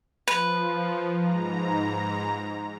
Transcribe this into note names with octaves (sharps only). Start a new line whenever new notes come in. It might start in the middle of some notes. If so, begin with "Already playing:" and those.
F3 B4
G#2 A#5